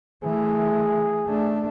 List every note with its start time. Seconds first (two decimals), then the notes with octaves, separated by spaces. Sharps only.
0.24 E3 A3 G#4
1.26 A3 D4